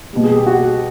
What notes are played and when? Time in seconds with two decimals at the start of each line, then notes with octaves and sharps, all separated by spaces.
0.13 B2 G3
0.24 G#4
0.36 G4
0.47 F#4